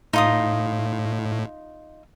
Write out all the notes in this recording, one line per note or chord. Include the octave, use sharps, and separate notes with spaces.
A2 D#4 F4 D#6